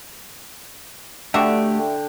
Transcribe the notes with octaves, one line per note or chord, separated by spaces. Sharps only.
D3 A3 D4 F#4 G4 E5 G5